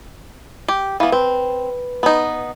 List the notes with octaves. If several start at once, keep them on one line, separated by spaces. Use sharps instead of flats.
G4
E3 B3 F5
C4 B4
B3 D#4